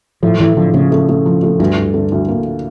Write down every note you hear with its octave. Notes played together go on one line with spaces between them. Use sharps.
A2 F3
A2 E3
D3 F3
C#3 A3
A3
A3
F3
A3
D2 G2
D2
D3
D2
A#3